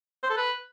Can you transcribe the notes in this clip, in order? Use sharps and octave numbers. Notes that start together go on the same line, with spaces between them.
C5
A4
B4